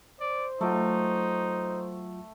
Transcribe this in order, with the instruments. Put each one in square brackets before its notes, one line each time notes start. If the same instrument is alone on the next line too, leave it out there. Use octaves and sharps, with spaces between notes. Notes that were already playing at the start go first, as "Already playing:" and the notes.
[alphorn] C5 [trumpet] D5
[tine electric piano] F#3 F4 F#5 [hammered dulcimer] A3 [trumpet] D#4